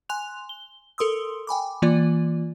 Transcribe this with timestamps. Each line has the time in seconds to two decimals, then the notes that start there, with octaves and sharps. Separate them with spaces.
0.09 G#5 C6 F#6 F7
0.49 G7
0.98 A4 A#4 C6 D#6 E6
1.47 G5 G#5 B5 D6
1.82 E3 A#3 F4 D5